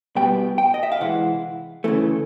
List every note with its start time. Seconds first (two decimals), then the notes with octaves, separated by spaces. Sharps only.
0.15 C2 B2 G3 B3 G5
0.58 G5
0.74 D#5
0.83 E5
0.92 F5
1.00 C3 E3 G#3 F#5
1.84 D2 C#3 E3 A3